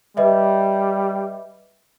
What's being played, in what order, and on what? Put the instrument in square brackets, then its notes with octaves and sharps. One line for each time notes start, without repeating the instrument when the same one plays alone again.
[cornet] G3 [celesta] B4 D#5 E5